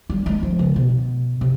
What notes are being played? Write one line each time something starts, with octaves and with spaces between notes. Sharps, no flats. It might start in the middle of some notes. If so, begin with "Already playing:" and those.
G3
G#3
F3
C#3
B2
C3